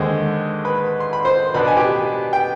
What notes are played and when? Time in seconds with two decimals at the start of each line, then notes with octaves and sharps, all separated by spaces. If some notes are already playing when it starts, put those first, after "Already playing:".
Already playing: D#2 D3 G#3 C5
0.65 B4 B5
1.00 C6
1.13 B5
1.25 C5 C6
1.54 B2 B3 D4 B4 B5
1.68 G#5
1.77 G4 G5
2.33 G5